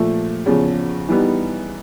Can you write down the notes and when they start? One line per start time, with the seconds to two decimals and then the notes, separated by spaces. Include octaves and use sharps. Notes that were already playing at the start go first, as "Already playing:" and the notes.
Already playing: A#2 F3 A3
0.46 E2 C#3 F3
1.09 E3 G3 B3 D#4